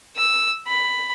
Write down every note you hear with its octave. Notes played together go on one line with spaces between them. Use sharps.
E6
B5